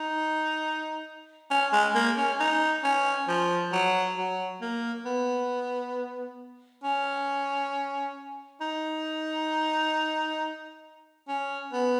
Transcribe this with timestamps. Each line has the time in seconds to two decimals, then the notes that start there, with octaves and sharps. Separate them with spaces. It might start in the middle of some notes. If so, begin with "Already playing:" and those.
Already playing: D#4
1.51 C#4
1.73 G#3
1.95 A#3
2.17 C#4
2.40 D#4
2.84 C#4
3.28 F3
3.72 F#3
4.17 F#3
4.61 A#3
5.05 B3
6.84 C#4
8.61 D#4
11.28 C#4
11.73 B3